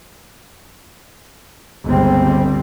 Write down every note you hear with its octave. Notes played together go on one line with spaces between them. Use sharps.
G1 C#2 G3 G#3 C4